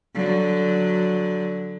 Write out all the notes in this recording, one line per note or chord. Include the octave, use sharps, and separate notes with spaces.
D3 F#3